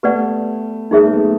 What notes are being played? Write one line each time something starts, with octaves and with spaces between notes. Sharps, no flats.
A3 B3 G4 B4 D5 F#5
G#3 A#3 D#4 G#4 C#5 E5
A3 B3
A3 B3